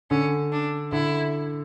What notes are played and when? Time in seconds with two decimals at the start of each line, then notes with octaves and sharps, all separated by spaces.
0.10 D3 C#4
0.52 D4
0.92 D3 E4